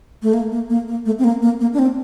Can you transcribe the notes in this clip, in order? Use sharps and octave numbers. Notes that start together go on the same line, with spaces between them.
A3
A#3
A#3
A#3
A#3
A3
C4
A#3
A#3
A#3
D4
C4